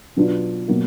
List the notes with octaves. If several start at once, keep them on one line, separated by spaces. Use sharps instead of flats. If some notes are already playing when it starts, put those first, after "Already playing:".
B2 F#3 B3 D4 F4
B2 F#3 A#3